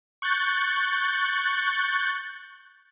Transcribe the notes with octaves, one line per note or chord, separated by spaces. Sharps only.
C#6 F#6 G6 A6